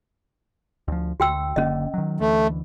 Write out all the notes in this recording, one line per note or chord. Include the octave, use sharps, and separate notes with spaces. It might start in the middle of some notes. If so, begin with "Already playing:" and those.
D2 F3
D2 F#4 G5 E6
F#1 D3 A#3 C#4 D#5
D#3 F#3
D2 E3 A3